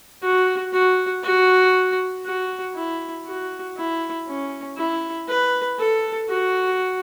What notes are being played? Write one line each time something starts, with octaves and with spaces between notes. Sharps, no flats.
F#4
F#4
F#4
F#4
E4
F#4
E4
C#4
E4
B4
A4
F#4